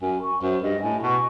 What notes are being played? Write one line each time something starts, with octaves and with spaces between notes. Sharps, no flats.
F#2 G#5
C#6
F#2 C5
G2 D#5
A2 G#5
B2 C#6